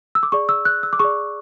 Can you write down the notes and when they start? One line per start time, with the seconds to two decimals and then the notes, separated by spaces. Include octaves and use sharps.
0.15 E6
0.23 D6
0.32 G#4 D5 C#6
0.49 E6
0.65 F#6
0.83 E6
0.93 D6
0.99 G#4 D5 C#6